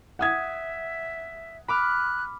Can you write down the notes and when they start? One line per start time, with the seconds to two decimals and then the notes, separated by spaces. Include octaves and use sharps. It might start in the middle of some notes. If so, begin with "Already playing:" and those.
0.19 E5 F#5 D#6 G#6
1.68 B5 D6 F6 F#6